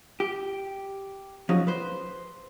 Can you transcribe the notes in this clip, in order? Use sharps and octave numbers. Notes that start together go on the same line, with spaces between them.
G4
F3 F#3 C#4 D#4 G#4
B4 C5